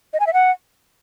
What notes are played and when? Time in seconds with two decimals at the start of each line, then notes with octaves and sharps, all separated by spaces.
0.13 D#5
0.20 G#5
0.27 E5
0.33 F#5